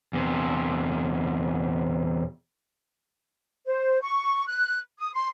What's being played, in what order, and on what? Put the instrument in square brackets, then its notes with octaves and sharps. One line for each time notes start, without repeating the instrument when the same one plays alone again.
[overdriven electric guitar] E2 C3
[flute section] C5
C#6
F#6
D#6
C6